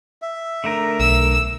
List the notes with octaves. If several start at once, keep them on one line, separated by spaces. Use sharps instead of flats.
E5
D3 A3 A#4
B1 E6